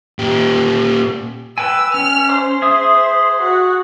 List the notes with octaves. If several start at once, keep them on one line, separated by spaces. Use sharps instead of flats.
A#2 G4
B4 G5 G#5 E6
C#4 F6
C5
G#4 E5 D#6
F#4